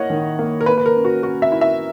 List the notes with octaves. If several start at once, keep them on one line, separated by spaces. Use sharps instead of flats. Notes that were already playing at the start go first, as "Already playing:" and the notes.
Already playing: A#3 E4 C#5 D#5 F#5
D#3
A#3
A#4
A#3 B4
B4
A#4
C#4
F#4
C#4 F#4
E5
E4
E5